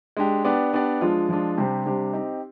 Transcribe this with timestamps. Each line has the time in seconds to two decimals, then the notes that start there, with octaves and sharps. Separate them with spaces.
0.17 G#3 D4 G4
0.45 B3 D4 G4 D5
0.73 B3 D4 G4 D5
1.01 F3 G#3 D4 F4
1.29 F3 G#3 D4 F4
1.58 C3 G3 D4 G4 C5
1.85 C3 G3 D4 G4 C5
2.13 C4 D#4 G4